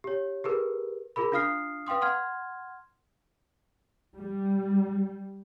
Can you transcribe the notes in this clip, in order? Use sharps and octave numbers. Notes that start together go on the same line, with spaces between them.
G4 C#5
G4 G#4 A#4 B4
F4 G#4 A#4 B5
D4 F4 F5 D#6 F6 C7
B4 F5 G5 C6 D#6
F#5 C6 F6 G#6
G3